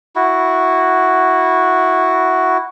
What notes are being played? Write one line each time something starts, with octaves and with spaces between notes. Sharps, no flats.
E4 F#4